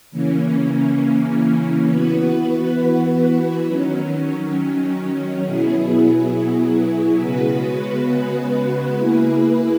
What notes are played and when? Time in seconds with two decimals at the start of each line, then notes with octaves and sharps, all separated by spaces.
0.11 C#3 E3 A#3 C#4
1.88 E3 B3 F#4 B4
3.66 D#3 F#3 C#4
5.42 B2 F#3 B3 E4 G#4
7.20 C#3 G#3 B3 F#4 B4
8.97 A#3 E4 G#4 B4